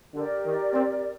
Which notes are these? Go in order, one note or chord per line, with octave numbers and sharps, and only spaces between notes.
D3 G4 A#4 D5
D#3
C4